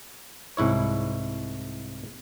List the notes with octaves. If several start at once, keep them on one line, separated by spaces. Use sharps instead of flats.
C2 G#2 E4 C#5